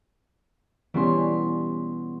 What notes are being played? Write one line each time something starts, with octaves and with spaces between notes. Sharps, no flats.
B2 E3 G3 C#4 C6